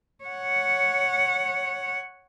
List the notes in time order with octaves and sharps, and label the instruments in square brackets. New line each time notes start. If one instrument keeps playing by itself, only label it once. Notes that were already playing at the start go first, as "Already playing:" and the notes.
[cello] C#5 F#5